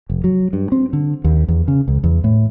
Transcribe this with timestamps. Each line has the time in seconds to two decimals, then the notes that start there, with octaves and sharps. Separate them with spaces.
0.10 F1
0.24 F#3
0.53 G2
0.72 C4
0.93 D3
1.24 D#2
1.48 E2
1.68 C#3
1.88 C#2
2.04 E2
2.24 A2